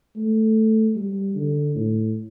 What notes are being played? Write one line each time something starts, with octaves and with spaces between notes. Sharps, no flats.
A3
G3
D3
A2